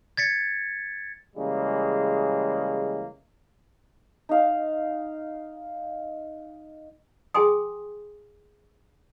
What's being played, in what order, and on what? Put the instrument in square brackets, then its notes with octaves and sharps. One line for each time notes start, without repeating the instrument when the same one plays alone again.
[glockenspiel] G#6 A6 B6 C#7
[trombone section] C#3 E3 G3 G#3 A#3
[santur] D#4 F5
[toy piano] G#4 G5 G#5 C6 D#6